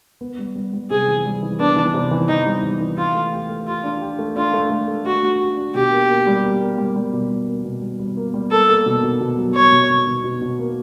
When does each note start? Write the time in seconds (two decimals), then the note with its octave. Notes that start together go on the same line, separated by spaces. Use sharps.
0.21 B3
0.39 G3
0.56 G3
0.73 G3
0.90 C3 G#4
1.08 E3
1.25 G3
1.43 E3
1.60 B3 D4
1.76 E3
1.94 C3
2.11 E3
2.28 E3 D#4
2.46 G3
2.63 E3
2.80 E3
2.98 F4 G4
3.15 A3
3.33 G4
3.50 A3
3.67 F4 G4
3.84 D4
4.02 G4
4.19 A3
4.36 D4 F4
4.53 A3
4.70 A3
4.88 A3
5.05 A3 F#4
5.22 D4
5.40 G4
5.57 D4
5.75 B2 G4
5.91 A#3
6.09 A#3
6.27 G3
6.44 A#3
6.61 A#3
6.78 G3
6.96 G3
7.13 B2
7.31 G3
7.47 A#3
7.65 B2
7.82 G3
7.99 G3
8.17 A#3
8.34 G3
8.51 A#3 A4
8.69 A#3
8.86 B2
9.03 B2
9.21 B2
9.38 F#3
9.55 F#3 C#5
9.72 B2
9.90 B2
10.07 B2
10.24 B2
10.41 B2
10.59 A#3